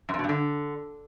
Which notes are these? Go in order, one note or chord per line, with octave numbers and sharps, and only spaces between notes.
F#2
F2
B2
G2
D3